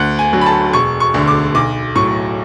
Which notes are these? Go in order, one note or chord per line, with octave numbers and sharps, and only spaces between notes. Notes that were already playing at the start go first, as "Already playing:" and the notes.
Already playing: D2 F#5
G#5
D3 F#3
B5
A5
E1 C#6
C#6
D2 D3
D6
B1 D6
A2 F#3 C#6